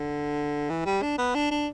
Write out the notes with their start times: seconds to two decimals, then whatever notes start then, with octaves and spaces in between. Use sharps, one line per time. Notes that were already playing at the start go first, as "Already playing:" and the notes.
Already playing: D3
0.70 E3
0.86 G3
1.02 D4
1.18 B3
1.35 D4
1.51 D4